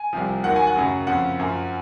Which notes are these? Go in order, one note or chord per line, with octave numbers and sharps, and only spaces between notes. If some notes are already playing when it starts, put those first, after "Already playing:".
Already playing: G#5
C2 C3 F3
D#2 D#3 F#3 F#5
G#5
F#5
F#2 C#3 F#3
F2 C#3 F3 F#5
F#2 F3